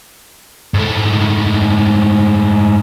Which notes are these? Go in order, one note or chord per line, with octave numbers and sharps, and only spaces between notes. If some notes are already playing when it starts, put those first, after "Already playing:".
G#2 A3